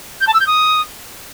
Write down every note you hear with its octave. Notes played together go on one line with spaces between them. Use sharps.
G6
A5
E6
G6
D#6